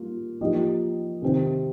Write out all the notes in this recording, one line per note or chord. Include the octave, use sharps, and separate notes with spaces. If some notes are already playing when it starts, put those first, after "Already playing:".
Already playing: G3 A#3 F4
F3 A#3 D#4 G4 D#5
C3 D#3 C4